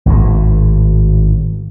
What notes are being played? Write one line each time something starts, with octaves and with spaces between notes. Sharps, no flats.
G#1 A2